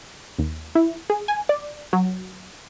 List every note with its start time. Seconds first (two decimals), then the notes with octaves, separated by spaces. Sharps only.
0.39 D#2
0.75 E4
1.10 G#4
1.28 G#5
1.49 D5
1.93 F#3